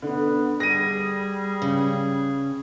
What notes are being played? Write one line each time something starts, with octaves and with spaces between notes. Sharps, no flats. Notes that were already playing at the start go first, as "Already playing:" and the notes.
D3 B3
G3 G#4 A#6 D#7
C#3